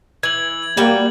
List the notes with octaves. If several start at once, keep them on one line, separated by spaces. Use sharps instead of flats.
E3 G#6 F#7
G3 A#3 F#4 G5